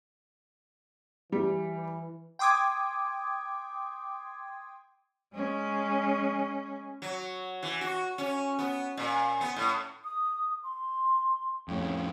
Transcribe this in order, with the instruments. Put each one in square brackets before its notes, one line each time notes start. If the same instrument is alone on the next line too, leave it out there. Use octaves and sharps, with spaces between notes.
[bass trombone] E3 [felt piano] G3
[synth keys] G5 C6 D6 D#6 G#6
[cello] G#3 C#4
[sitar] F#3
E3
F#4
C#4
B3
A#2
B3
A2
[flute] D#6
C6
[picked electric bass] F2 A2 [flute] C#4